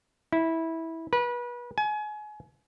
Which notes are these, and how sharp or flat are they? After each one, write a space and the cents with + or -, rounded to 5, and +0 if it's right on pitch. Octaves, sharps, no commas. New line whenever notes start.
E4 -15
B4 -30
G#5 +30